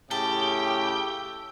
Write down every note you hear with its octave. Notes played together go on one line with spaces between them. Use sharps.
A2 C#3 G4 A4 G5